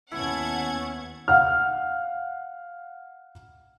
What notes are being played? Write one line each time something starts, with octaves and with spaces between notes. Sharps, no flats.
D#2 B3 C#4 E4 F#5 A5 G#6
F5 F#5 F6